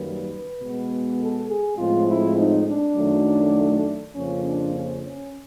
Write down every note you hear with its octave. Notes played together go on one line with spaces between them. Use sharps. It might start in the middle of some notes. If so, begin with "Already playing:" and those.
Already playing: F#2 D#3 G3 A#3 B4
B2 G#3 B3
A4
G#4
A2 F3 G#3 C4 F4
E4
D#4
D4
F#2 D#3 F#3 A3
F2 C#3 F3 A#3 C#4
D4
C#4
C#4